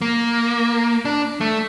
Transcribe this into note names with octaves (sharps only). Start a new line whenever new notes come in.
A#3
D4
A3